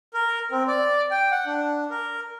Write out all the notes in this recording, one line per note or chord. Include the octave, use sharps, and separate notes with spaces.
A#4
C4
D5
G5
F#5
D4
A#4